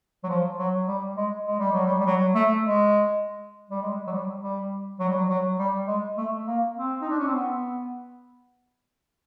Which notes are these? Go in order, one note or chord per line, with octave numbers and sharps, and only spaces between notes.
F#3
F3
F#3
G3
G#3
G#3
G3
F#3
G3
G3
F#3
A3
G#3
G3
G#3
F#3
G3
G3
F#3
G3
F#3
F#3
G3
G#3
A3
A#3
C4
D#4
D4
C#4
C4
B3